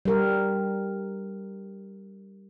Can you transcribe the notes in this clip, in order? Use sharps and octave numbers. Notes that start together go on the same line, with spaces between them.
G3 A#4